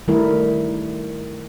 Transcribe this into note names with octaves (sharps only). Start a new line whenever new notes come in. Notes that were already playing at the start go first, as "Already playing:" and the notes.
D#3 G3 A3 D#4 E4 A#4